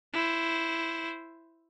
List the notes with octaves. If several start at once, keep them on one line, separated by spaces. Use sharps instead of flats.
E4 C5